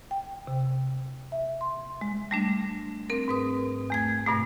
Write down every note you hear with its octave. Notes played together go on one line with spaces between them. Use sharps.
G5
C3
E5
C6
G#3
G3 A3 D4
C4 A#4
G#2 B4 D#6
E2 A3 G#6
G2 B2 A3